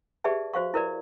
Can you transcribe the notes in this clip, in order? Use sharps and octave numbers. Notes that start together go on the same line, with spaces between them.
G4 G#4 B4 D5 E5 A5
F#4 C5 F5 C#6
E4 A#4 B4 D5